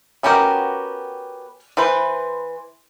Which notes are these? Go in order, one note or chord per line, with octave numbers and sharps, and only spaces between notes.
B3 C#4 F#4 G4 A#4
E3 B4 C5